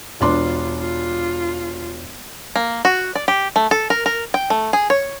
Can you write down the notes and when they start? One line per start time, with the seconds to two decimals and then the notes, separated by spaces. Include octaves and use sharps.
0.21 E1 D4 F4 C6
0.81 F4
2.56 A#3
2.85 F#4
3.15 D5
3.28 G4
3.56 A3
3.71 A4
3.90 A#4
4.06 A#4
4.34 G5
4.50 A3
4.73 G#4
4.90 C#5